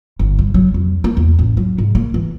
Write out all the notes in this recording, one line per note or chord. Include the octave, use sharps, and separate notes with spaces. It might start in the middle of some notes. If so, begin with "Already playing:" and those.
G1
G2
F#3
F2
A#3
E2
A1
F#3
G#2
A#3
E3